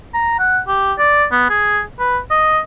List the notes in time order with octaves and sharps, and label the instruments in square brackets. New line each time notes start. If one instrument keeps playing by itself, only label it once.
[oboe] A#5
F#5
G4
D5
B3
G#4
B4
D#5